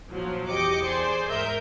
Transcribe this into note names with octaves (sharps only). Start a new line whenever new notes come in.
A#1 F3 F#3
E2 G4 D#5 G5 D6 C#7
G#4 C5 D5 G#5
G#2 A#4 D#5 E5 G6